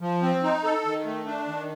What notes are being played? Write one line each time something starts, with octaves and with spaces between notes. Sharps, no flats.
F3
C4
D#4
A4
D#3
A3
D4
D#3